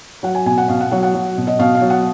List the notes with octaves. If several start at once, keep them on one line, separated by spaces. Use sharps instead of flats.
F#3 F#5
G#5
B2 G#5
F#5
B2 F5
F#5
F#3 F#5
F#5
F#3
B2
D#5
B2 F5
F5
F#3
F#5